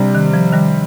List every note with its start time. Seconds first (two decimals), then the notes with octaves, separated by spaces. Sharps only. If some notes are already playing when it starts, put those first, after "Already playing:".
Already playing: C3 G3 D4
0.15 D#3
0.34 F3
0.53 D#3 G3